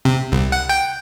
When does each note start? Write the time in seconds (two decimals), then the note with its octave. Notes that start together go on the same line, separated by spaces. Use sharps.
0.05 C3
0.32 C2
0.52 F#5
0.69 G5